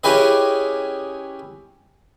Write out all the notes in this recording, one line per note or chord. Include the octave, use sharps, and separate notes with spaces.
C#4 E4 G4 G#4 B4 D#5